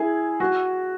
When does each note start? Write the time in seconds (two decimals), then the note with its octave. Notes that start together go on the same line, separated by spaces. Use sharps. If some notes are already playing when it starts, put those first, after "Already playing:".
Already playing: E4 G#4
0.40 F#4